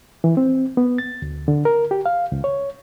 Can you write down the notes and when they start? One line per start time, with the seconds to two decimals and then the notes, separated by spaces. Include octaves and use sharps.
0.24 E3
0.37 C4
0.77 B3
0.98 A6
1.22 D2
1.48 D3
1.65 A#4
1.91 G4
2.06 F5
2.32 C#2
2.44 C#5